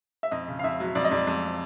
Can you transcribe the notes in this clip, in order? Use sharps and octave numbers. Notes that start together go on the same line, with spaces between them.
E5
F2 D#5
C#3
F5
F2 E5
F#3
F2 D5
D#5
F2 D5
F2